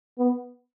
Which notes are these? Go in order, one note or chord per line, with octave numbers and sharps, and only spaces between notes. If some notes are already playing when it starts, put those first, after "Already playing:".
B3